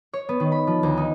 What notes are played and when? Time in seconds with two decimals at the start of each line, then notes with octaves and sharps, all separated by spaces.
0.13 C#5
0.29 B3
0.40 D#3
0.52 B5
0.67 F3
0.83 D2
0.97 D#4